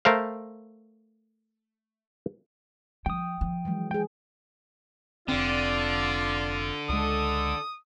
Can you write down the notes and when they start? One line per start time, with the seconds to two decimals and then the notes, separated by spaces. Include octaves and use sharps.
0.05 A3 A#4 C5 F5
3.06 F3 G5 D#6
3.41 F3
3.65 E3 F#3 G#3
3.91 G#3 G#4 G5
5.28 F1 D3 C4 F4 D5
6.89 C#2 G#3 A4 D#6